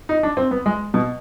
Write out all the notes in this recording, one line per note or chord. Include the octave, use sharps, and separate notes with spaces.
D#4
D4
C4
B3
G#3
B2